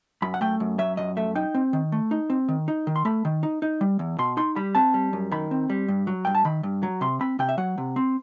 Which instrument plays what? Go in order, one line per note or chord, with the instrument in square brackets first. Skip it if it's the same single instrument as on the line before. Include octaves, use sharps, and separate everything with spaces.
[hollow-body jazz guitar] F#2 B5
F#5
A3 G5
F#2
F#3 E5
F#2 D#5
A3 E5
D#4 G5
C4
D#3
A3
D#4
C4
D#3
D#4
D#3
C6
A3 B5
D#3
D#4
D#4
G3
E2
B2 C6
D#4 C6
G3 B5
C4 A5
G3
F#2
D#3 B5
C4
G3
G2
F#3
G2 G5
A5
D#3 B5
G2
F#3
C3 C6
C4 B5
C3 G5
E5
F#3 F#5
C3
C4